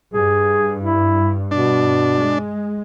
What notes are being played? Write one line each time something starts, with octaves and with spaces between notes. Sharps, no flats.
G2 G#4
E4
B2 D4
G#3